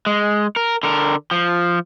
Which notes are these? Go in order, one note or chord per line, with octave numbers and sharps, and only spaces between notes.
G#3
A#4
D3 A#4
F3